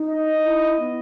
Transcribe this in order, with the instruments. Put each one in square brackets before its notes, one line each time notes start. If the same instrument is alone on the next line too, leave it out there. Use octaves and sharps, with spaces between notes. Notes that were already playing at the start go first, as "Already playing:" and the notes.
Already playing: [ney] D#4
[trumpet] D#5
[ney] E4
B3